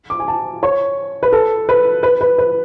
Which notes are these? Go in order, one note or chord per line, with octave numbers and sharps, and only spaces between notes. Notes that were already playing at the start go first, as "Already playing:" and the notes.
D6
G#5
A5
C#5
B4
A4
B4
B4
B4
B4